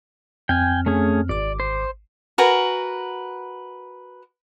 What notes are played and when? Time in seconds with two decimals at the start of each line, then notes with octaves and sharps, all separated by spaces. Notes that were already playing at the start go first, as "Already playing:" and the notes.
0.49 F2 C4 G5 G#5 F6
0.86 A3 C#4 G#4
1.29 G#1 D5 D6
1.60 C5
2.38 F#4 A#4 B4 G#5